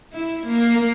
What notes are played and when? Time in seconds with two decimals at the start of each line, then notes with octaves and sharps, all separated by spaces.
0.13 E4
0.47 A#3